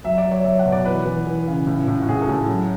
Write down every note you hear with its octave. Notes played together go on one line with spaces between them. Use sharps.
F#3 E5
D5
F#3
C#5
F#3 E5
F#5
B2
D5
E3 B4
E3
E3
C#3
A2
A2
F#4
A2 G#4
A4
A2
F#3